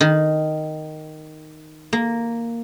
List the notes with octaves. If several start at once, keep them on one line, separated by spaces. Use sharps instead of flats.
D#3
A#3